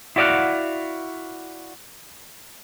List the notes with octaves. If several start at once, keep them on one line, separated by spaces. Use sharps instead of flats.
E4 F#4 D5 D#5 F5 F#5